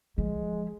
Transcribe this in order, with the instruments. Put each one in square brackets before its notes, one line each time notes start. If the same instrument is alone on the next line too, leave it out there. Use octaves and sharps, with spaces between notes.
[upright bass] F3 [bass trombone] G#3